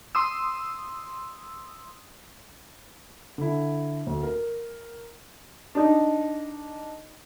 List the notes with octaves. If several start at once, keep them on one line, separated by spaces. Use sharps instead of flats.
C6 D#6 E6
D3 E4
D2
A#4
D4 D#4